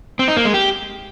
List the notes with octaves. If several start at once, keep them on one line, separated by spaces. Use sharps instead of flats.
C4
D#4
A#3
G#3
G4